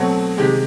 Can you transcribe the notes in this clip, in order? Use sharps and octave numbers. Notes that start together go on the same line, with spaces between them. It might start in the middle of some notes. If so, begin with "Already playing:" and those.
Already playing: B2 F#3 A3 C4
C3 D#3 G#3 G4